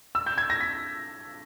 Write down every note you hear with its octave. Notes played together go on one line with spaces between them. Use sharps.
E6
G6
G#6
A#6
B6